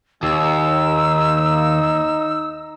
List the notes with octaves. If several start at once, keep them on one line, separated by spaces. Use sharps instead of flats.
D#2 D#4 E6